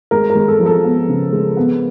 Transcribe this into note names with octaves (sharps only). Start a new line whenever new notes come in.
G#3 A#4
A#4
G#3
A4
F3
A4
B3
C#3
G#3
B3